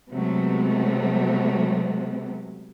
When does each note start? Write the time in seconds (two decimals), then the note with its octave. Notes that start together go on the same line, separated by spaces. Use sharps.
0.11 C3 F#3 G#3 A3 B3